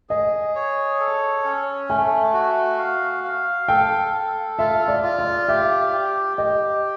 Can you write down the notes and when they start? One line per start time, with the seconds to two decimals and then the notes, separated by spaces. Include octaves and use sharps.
0.09 G#4 D#5
0.55 C#5
0.99 A4
1.44 C#4
1.90 A3 G#5
2.34 F#4
2.79 F5
3.24 F5
3.68 A4 G5
4.13 A4
4.59 F4 E5
4.88 D5
5.03 F4
5.19 D5
5.48 G4 E5
5.92 G4
6.37 G4 D#5